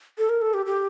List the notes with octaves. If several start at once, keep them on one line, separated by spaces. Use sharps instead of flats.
A4
A#4
A4
G4
G4